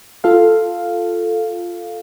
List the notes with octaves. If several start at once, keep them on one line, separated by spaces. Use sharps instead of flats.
F4 A4 F5